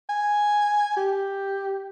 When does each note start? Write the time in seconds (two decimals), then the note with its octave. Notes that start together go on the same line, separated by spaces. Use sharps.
0.09 G#5
0.97 G4